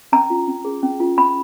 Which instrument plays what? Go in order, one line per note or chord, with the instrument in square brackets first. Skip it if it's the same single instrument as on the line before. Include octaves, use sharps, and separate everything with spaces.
[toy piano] C#4 A#5
F4
C#4
G#4
C#4
F4
C#4 B5